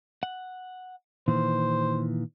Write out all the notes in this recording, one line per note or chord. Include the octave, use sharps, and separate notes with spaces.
F#5
A#2 D#3 E3 C5